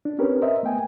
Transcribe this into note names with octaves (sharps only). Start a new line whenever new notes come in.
D4
C4 C#4 G4 A#4 B4
A#4 C5 D#5 E5
A3 B3 G5 G#5